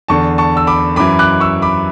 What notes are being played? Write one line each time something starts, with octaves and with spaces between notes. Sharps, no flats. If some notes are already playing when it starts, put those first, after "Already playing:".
E2 D3 A5 C#6
A5 C#6
E6
B5 D6
F#2 E3 B5 D6
D6 F#6
C#6 E6
B5 D6